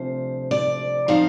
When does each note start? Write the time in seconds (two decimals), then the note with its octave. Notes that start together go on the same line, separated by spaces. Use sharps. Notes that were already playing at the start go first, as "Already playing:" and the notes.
Already playing: D2 C3 F3 C5
0.51 D5
1.08 F3 C4 D#4 F5